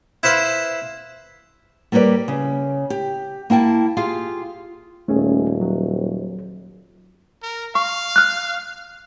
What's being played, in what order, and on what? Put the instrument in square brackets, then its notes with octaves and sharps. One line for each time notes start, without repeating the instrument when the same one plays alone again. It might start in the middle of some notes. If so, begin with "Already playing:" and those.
[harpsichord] E4 B4 C5 F5
[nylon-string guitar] G3 A#3 G4 B4 D5
C#3
G4
A#3 E4 G5 A5
F4 G4 G#4 F5
[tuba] D#1 [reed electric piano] A3 C#4 G#4
[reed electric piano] F#3
[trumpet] A#4
[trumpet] F5 [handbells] C#6
[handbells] F6 F#6